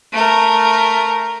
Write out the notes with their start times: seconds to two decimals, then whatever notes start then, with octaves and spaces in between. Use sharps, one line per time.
0.12 A3 A#4